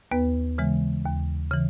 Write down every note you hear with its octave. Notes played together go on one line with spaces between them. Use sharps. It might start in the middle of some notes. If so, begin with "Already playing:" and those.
D#2 B3 B4
C#3 E3 G#3
D#2
C#3 E3